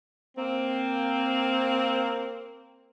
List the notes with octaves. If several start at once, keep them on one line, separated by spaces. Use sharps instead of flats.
A#3 C4